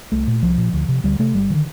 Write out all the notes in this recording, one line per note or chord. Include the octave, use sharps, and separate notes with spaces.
C2 A3
A#2
C2 F3
A#2
D2
C3
D2 G3
C3 A3
G1 G3
D3 D#3